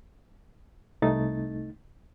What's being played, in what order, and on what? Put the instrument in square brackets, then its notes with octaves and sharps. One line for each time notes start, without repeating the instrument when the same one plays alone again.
[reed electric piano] C2 A3 D#4 A6